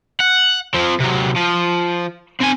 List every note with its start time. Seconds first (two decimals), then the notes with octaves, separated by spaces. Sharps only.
0.20 F#5
0.74 F3 C4
1.00 C3 F#3
1.36 F3
2.40 C4 G#5